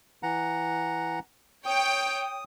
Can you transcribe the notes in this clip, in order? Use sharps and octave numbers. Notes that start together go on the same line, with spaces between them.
E3 F#5 A#5
C#5 G5 D#6